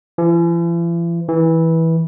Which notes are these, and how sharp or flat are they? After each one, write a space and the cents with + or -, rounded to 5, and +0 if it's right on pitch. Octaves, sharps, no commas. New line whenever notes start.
E3 +45
E3 -15